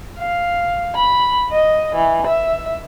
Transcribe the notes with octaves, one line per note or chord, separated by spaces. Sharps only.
F5
B5
D#5
E3
E5